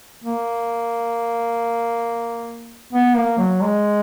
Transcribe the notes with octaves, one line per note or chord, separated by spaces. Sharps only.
A#3
B3
A#3
F#3
G#3